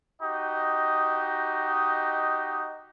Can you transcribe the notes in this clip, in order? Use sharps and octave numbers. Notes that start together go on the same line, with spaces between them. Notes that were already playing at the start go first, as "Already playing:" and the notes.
D#4 F#4 G4 D#5